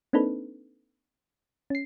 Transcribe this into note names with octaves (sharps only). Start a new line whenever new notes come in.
A#3 C4 D4 D#4 A4 B4
C#4 C7